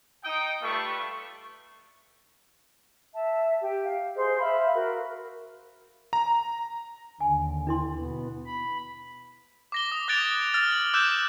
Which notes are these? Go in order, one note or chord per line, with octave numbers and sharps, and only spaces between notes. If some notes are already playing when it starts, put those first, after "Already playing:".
D#4 G5 D#6
G3 A3 F4 A4 B4 C#6
E5 A5
G4
F5
G#4 C5 D#5
E5 F5 B5
F#4 A#4
A#5
D#2 D3 G#5
D4 E4 C6
B2 B3
B5
D6 A#6 G7
D#6
D6 F#6 G#6 A6 D7 F7
E6 F6 A6
F#7
D6 E6 F#6 G6 E7